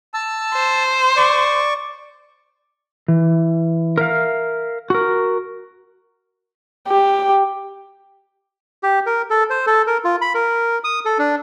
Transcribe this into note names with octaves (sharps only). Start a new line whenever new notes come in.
A5 E6
C5
D5 C#6
E3
A#4 E5 F5
F#4 A#4
G4
G4
A#4
A4
C5
A4
A#4
F4
B5
A#4
D#6
A4
D4